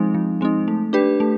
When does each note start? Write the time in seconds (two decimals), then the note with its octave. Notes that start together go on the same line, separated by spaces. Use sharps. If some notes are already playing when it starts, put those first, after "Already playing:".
Already playing: F3 G#3 C4 D#4
0.14 F3
0.41 G#3 C4 D#4
0.68 A3
0.93 D4 G4 B4
1.20 A3